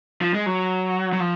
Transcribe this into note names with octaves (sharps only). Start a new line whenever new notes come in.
F3
G#3
F#3
F#3
F3